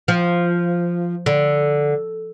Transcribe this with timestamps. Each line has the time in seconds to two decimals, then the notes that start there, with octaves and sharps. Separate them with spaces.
0.08 F3
1.26 D3